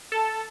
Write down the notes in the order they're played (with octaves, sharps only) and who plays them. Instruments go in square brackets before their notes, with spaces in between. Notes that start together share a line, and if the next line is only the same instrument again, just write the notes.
[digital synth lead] A4